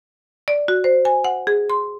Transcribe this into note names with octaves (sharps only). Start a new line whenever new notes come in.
D5
F#4
C5
G#5
F#5
G#4
C6